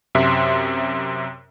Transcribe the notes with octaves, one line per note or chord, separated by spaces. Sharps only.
F#2 C3 E5 C6